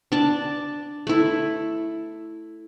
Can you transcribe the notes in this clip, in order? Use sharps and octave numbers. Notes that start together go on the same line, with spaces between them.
D4 A5
A3 E4